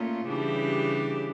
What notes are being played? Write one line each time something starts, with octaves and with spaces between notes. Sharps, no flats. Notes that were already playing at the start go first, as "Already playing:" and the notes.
Already playing: A#2 A3 C#4 F4
C#3 E3 G3 D4 G4